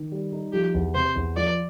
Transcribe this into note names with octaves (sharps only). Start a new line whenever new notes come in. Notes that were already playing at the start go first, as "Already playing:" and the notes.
Already playing: D#3
G3
D#4
F3 G4
E2
C3 C5
E2
F3 D5